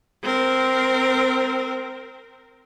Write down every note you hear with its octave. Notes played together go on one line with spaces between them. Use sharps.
C4 A#4